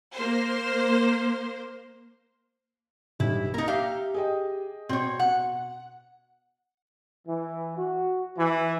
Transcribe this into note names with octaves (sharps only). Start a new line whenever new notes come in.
A#3 C5
B1 G2 E4
A#3 D#4 A#4
G4 E5 F5 A#5
G#4 D#5 G5
B2 C4 C#5
F#5
E3
F#4
E3